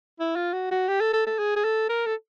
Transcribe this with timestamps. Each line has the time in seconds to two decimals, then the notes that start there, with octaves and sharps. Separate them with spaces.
0.20 E4
0.36 F4
0.53 F#4
0.71 F#4
0.88 G4
1.01 A4
1.13 A4
1.27 A4
1.39 G#4
1.56 G#4
1.64 A4
1.89 A#4
2.06 A4